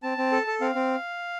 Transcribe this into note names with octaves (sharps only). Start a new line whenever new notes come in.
C4 A5
C4
A4
A4
C4 F5
C4